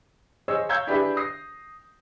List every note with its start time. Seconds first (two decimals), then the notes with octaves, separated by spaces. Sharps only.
0.48 G#4 C5 C#5 D#5 E6
0.69 C#5 F5 A#5 E6 G6 G#6
0.87 D4 E4 G4 G#4 B4 E5
1.17 D#6 A#6 C7